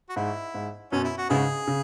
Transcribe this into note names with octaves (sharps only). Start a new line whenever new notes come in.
F#4
G#2 E4
G#2
F#2 B2 C#4
E4
F#4
G#2 C#3 B3 E4 G#4
C#3